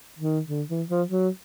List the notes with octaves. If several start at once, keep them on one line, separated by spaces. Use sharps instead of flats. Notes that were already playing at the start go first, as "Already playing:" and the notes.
D#3
D3
E3
F3
F#3